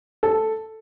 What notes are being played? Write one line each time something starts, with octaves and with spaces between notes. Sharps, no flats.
A4